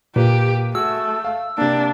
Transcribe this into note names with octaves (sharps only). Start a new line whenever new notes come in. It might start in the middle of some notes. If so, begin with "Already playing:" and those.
A#2 A#3 G4 B4
A3 F#4 G#4 E6
F5
C3 A#3 D4